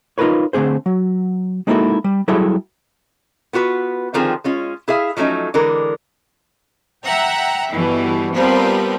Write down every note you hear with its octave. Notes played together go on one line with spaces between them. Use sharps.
D#4 F4 F#4 A#4 B4 C#5
D3 A3 C4 G#4 C5
F#3
G#3 A#3 D#4 E4 F#4 A4
G3
F#3 G3 E4 G#4 A4 E5
B3 F4 F#4 B4
D3 D#3 F3 C4 G#4 C5
G#3 C#4 F4
E4 G#4 E5 F5
F3 F#3 A3 C#4 D#4
D3 E3 G#3 A#4
E5 F#5 G5 A#5
G1 B2 E3 G3
F3 G3 B3 C4 A#4 B4